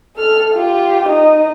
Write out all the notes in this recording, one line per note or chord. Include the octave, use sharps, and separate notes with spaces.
A4 F6
F4 G4
D#4 D#5